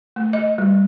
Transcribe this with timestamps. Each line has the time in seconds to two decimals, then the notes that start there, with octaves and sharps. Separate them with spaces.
0.16 A3
0.33 D#5
0.58 G3